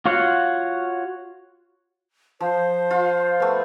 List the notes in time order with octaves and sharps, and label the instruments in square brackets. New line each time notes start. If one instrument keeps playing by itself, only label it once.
[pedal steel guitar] F4 F#4 C#5 F5 F#5
[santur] F3 [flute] C5
[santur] F4
A3 B3